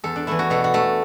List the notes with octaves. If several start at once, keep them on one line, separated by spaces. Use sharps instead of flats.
E2 A4
D4
E3 A3 E4
F#4
B2 A4
F#4
A3 A4